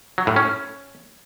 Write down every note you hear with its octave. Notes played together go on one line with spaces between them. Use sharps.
F#3
A2
C#4